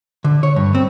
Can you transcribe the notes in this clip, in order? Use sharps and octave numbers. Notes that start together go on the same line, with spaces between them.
D3
C#5
G2
C4